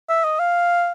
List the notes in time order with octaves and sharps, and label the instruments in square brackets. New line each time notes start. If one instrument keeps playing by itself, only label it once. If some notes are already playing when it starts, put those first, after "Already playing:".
[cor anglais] E5
D#5
F5